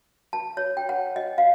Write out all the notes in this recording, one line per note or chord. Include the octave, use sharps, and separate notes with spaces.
A5
C#5
G5
F#5
D#5
F5